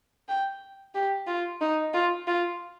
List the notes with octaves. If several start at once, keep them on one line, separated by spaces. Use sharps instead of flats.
G5
G4
F4
D#4
F4
F4